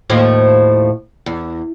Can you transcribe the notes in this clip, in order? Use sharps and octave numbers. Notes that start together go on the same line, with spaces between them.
D#2 A2 F3
E2